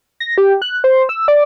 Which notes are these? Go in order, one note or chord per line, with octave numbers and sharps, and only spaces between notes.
A#6
G4
F#6
C5
E6
D5